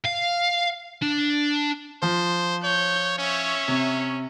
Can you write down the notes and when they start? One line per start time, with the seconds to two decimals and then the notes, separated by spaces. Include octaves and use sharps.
0.05 F5
1.02 D4
2.02 F3 C5
2.64 C#5 G6
3.18 C#4 C#5 E5
3.68 C3